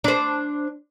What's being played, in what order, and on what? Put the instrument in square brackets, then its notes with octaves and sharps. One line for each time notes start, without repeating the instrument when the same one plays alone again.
[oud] D4 C5